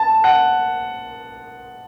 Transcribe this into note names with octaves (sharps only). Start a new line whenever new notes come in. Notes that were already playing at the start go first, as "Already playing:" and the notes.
Already playing: A5
F#5